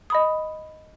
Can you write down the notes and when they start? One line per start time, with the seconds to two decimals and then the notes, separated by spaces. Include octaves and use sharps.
0.10 D#5 B5 D#6